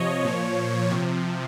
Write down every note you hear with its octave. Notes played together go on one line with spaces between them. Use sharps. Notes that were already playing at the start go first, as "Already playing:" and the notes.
Already playing: C3 F3 C#5 D#5
A#2 F3
C3
F3